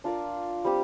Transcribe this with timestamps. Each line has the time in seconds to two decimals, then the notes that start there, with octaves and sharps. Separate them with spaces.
0.04 D4 F4 A#4 D5
0.65 G3 C4 G4